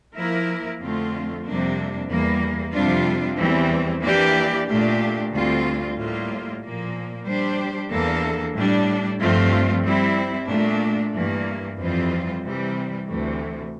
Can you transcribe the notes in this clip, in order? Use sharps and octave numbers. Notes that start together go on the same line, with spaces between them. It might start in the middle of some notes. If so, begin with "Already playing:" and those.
F3 A#3 E4 A#4
F2 D3 A3 C4 F4
F2 C3 G3 A#3 D4
E2 E3 G3 A#3
F2 C3 G3 D4 F4
E2 E3 G3 C4
E3 A#3 D4 G4 D5
A#2 A3 D4 G4
D2 D3 G3 C4 F4
A2 G3 A#3 F4
A#2 F3 A#3
G3 D4 G4 C5
E2 E3 A#3 D4 A4
A2 G3 D4
G2 F3 A3 C4 F4
G3 C4 E4
A#2 A3 D4
G2 E3 A#3
F2 E3 G3 C4 F4
C3 E3 G3
D2 C3 E3 A3